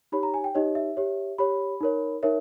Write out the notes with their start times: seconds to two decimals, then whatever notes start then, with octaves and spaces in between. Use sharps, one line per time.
0.12 D#4 G4 C#5 B5
0.23 A#5
0.34 G#5
0.44 G5
0.55 D#4 G4 C#5 D#5
0.75 E5
0.97 G4 C#5
1.38 G4 C#5 B5
1.81 D#4 A#4 C#5
2.23 D#4 A#4 C#5 E5